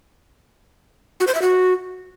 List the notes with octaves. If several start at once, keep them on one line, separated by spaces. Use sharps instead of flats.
F#4
C5
E5
F#4